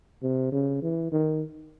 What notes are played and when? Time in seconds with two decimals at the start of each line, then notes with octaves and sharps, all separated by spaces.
0.22 C3
0.52 C#3
0.82 E3
1.12 D#3